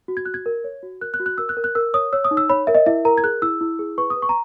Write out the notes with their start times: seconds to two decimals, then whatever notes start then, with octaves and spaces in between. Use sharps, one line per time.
0.08 F#4
0.17 G#6
0.25 F#4 F#6
0.34 G#6
0.46 A#4
0.64 C#5
0.83 F#4
1.01 A#4 F#6
1.14 F#6
1.20 F#4
1.26 F#6
1.38 A#4 E6
1.49 F#6
1.57 A#4
1.64 F#6
1.75 A#4 E6
1.94 C#5 D#6
2.13 C#5 E6
2.25 D#6
2.31 D#4
2.37 E6
2.49 C#5 B5
2.67 A#4 E5
2.75 D#5
2.86 E4 E5
3.05 A#4 A#5
3.18 G#6
3.24 G#4 F#6
3.42 E4 E6
3.61 E4
3.79 G#4
3.98 B4 C#6
4.10 D#6
4.16 B4
4.22 C#6
4.29 A#5